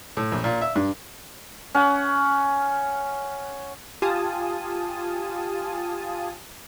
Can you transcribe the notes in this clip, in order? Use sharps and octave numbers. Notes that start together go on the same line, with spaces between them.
A2
A#1
A#2
E5
G2
C#4 F#5
F4 G4 F5 G#5 A5 D#6